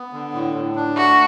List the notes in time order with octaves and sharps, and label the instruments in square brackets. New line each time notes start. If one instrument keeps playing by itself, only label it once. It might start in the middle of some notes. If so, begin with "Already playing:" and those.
Already playing: [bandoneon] B3
D3
A2
A2
D4
[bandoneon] A3 [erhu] F#4